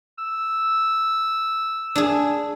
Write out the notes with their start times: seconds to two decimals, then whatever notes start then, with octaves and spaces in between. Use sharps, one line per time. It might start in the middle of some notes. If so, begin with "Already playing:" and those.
0.18 E6
1.95 D4 G#4